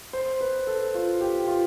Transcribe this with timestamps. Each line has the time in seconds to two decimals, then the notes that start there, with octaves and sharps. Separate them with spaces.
0.13 C5
0.41 B4
0.67 A4
0.94 F4
1.21 G4
1.47 F4